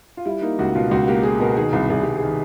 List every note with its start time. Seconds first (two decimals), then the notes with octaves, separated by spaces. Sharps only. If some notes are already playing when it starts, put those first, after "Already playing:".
0.17 F4
0.26 G3 E4
0.42 A#3 D#4
0.59 C#2 F#4
0.75 B2 F4
0.91 C#2 F#4
1.08 A#3 G4
1.23 A#3 G#4
1.40 B2 A#4
1.57 D#3 G#4
1.73 C2
1.90 C2 G#4
2.03 C2 G4
2.17 G#4
2.22 D#3